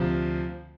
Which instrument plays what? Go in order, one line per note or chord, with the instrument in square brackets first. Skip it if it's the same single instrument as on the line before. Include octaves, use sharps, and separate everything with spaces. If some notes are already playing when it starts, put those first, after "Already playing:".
Already playing: [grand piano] D2 C3 F3